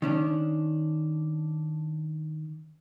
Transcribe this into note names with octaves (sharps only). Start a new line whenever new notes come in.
D#3 C#4 D4